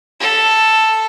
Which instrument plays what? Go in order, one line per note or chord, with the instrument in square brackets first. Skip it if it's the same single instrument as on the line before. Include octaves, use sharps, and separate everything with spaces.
[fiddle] A4